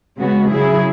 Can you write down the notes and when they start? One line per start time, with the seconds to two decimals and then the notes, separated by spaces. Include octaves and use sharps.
0.17 C#3 G#3 B3 F#4
0.50 C#3 F#3 E4 G#4